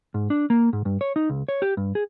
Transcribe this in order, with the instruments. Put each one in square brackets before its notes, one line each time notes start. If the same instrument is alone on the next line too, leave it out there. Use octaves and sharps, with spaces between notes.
[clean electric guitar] G#2
D4
A#3
G#2
G2
C#5
D#4
C#2
C#5
G4
G2
G#4